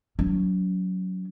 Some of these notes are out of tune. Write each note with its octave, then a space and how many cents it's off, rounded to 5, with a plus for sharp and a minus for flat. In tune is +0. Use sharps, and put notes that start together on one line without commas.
F#3 +0 C#4 +40